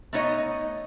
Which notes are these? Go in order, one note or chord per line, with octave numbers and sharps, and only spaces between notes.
A3 B3 D#4 C#5 D#5